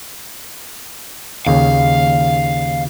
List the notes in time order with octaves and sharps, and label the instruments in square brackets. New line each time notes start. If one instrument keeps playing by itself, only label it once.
[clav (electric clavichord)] D#2 C#3 [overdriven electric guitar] F5